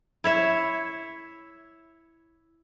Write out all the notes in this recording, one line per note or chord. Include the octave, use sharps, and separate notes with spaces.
E4 C#5 E5